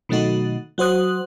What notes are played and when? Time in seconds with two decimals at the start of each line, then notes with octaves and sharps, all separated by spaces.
0.09 B2 D#3 F#3 A3 D#4 F#4
0.78 F#3 F#4 C5 D#6 F#6